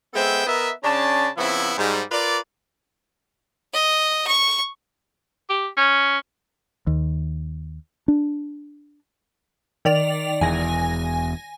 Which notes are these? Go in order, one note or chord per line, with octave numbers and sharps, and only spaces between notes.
G#3 B3 A4 C5 E5 G5
B3 A#4 D#5 E5
C#3 C#4 D4 A5
C#3 F3 B3 C4 E4
G#2 G3
F4 A#4 B4 D5
D#5
C#6
G4
C#4
D#2
D4
D#3 D5 F7
E1 E2 G#5 A#6